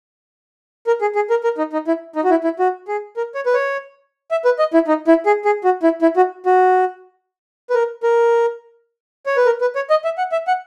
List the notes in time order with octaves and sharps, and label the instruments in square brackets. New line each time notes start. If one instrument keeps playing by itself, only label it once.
[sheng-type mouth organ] A#4
G#4
G#4
A#4
A#4
D#4
D#4
E4
D#4
F#4
E4
E4
F#4
G#4
A#4
C#5
B4
C#5
E5
B4
D#5
E4
D#4
E4
G#4
G#4
F#4
E4
E4
F#4
F#4
B4
A#4
A#4
C#5
B4
A#4
B4
C#5
D#5
E5
F#5
E5
F#5